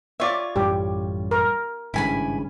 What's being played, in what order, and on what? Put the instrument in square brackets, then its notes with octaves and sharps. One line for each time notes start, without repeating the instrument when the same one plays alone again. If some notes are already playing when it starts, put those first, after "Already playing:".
[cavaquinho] F4 C#5 [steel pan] D5 E5
[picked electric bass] A1 F#2 G3 [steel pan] G4
[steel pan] A#4
[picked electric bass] G#1 G2 C#3 [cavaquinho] E4 G#5 B5